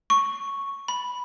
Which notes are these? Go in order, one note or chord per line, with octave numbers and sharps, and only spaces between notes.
C#6
B5